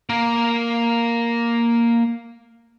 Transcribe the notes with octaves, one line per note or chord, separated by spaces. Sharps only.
A#3 A#4